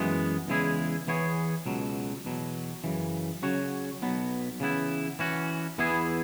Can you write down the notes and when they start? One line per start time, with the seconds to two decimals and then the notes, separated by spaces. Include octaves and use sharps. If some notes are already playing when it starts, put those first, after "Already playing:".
Already playing: F#2 E3 G#3 B3
0.48 E2 C#3 G#3 E4 G#4
1.07 E2 E3 B3 G#4 C#5
1.66 C#2 B2 F#3
2.25 E2 B2 F#3
2.84 F#2 C#3 E3
3.42 C#3 F#3 C#4 F#4 C#5
4.02 B1 B2 F#3 B3
4.60 C#3 E3 B3 E4
5.19 E3 C#4 F#4
5.78 E2 E3 B3 E4 G#4